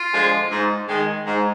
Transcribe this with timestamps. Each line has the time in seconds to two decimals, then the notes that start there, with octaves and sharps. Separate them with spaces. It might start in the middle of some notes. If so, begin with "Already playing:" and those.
Already playing: F4
0.12 D3 F3 G#3
0.51 G#2
0.88 D#3 G#3
1.25 G#2